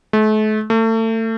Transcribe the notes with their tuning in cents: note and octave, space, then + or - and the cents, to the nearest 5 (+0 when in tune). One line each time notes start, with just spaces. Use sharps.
A3 -40
A3 +30